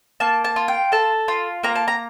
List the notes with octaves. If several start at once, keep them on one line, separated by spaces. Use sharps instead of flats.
A#3 A5
A5
F4
G5
A4 A5
F4
A#3 A#5
A5
A#5